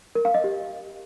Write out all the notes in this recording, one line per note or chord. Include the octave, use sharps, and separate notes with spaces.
A#4
F5
D#5
G4